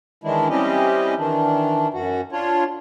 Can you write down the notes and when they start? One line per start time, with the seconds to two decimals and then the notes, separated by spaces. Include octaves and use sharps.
0.24 D#3 E3 G#3 D4 E4
0.50 G3 C4 C#4 E4 G4 D#5
1.18 D#3 E3 D4
1.94 F#2 F#4
2.32 D4 F4 C#5